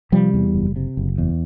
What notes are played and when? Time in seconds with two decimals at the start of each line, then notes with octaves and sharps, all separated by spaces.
0.12 C3 F3 G3
0.34 E2
0.55 F#1
0.76 C3
0.97 F#1
1.18 E2